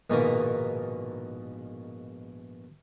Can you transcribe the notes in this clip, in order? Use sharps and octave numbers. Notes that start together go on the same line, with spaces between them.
A#1 G#2 B2 D#3 A#3 D#5